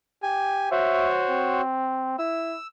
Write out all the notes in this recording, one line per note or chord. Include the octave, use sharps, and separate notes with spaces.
G4 G#5
F#4 C5 C#5 E5
C4
E4 E6